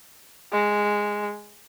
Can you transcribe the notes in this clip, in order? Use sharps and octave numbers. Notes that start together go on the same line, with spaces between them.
G#3